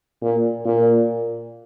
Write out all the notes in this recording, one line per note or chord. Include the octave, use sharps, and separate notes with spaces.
A#2
A#2